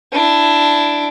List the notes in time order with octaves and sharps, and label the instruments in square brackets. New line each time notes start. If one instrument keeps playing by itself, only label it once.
[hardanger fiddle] D4 E4